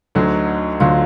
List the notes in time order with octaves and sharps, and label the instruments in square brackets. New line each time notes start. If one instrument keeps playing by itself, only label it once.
[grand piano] D2 D3 F#3 [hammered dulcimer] D#4
[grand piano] D2 D3 F#3 [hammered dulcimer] F4